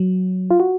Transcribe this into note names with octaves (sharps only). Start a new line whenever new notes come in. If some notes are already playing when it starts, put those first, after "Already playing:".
Already playing: F#3
F4
F#4